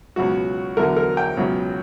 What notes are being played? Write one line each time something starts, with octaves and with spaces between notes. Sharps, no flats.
C#2 B2 F#3 F#4
E2 D3 F#3 A#4
A#4
G5
C#2 B2 F#3